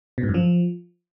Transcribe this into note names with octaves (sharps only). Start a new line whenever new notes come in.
B2
G#2
F#2
F3